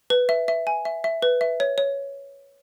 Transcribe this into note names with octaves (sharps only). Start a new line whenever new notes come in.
B4
E5
E5
G#5
E5
E5
B4
E5
C#5
C#5